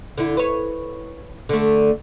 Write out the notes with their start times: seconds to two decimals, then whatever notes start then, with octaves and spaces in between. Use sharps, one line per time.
0.18 D3 E4
0.37 B4 C#5
1.49 D3 A3